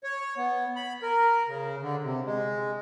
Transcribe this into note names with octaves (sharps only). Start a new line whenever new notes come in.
C#5
B3
B5
A#4
C#3
D3
C3
G#3